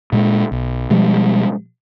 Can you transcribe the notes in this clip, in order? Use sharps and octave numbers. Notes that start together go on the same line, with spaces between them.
A#2 G#3
B1
B2 F3 G3 G#3